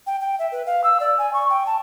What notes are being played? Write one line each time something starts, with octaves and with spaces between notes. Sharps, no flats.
G5
G5
E5
B4
F5
E6
D5
G#5
C#6
G5
A5